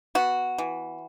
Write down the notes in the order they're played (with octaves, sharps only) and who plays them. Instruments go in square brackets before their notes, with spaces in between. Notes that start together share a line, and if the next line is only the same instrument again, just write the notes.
[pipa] B3 F#4
E3